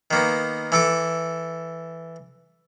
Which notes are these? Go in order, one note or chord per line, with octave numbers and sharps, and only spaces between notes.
D#3 A#3 B3
E3 A4 D6